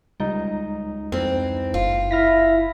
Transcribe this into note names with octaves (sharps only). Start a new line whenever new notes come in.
C#2 G3 D#4
F2 E3 C4
F#1 F4
E4 F6 A#6 B6